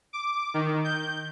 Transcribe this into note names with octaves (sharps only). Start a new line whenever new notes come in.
D6
D#3
G6